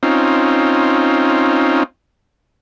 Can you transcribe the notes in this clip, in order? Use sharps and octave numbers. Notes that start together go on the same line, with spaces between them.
C4 C#4 D#4 F4